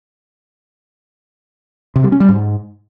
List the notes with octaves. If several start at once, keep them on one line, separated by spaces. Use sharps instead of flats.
C3
G3
C#4
G3
G#2